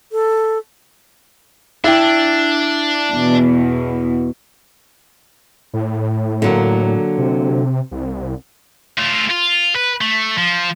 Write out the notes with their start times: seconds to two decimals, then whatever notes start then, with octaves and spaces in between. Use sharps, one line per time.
0.12 A4
1.84 D4 E4 G5
3.13 E2 B2
5.73 A2
6.42 D3 F#3 A#3
7.18 C3
7.91 C2
8.99 A3 F4
9.31 F4
9.76 B4
10.01 A3
10.38 F3